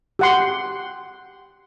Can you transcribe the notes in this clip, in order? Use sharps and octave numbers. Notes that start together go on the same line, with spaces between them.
G4 F#5 C6